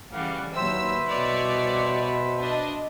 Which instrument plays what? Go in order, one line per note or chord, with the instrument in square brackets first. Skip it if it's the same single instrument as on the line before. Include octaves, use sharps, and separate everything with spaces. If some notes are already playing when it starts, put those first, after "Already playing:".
[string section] C#3 E3 G3 [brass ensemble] A3 F5 F#5
[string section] D#2 E6 [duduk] F#3 [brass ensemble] B4 [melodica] C5 E5
[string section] C2 C#5 D5 [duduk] B2
[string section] D4 D#5